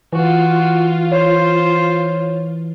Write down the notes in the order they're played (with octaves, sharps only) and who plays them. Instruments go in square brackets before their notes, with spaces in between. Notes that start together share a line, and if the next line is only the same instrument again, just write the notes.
[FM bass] E3 [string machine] F4 [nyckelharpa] F#4
[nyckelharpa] C5 [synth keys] C#5